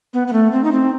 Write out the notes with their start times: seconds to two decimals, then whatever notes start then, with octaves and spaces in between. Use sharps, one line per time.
0.14 B3
0.28 B3
0.33 A3
0.52 C4
0.64 D#4
0.72 C4